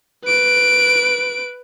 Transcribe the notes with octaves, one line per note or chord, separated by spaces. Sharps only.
B4 D7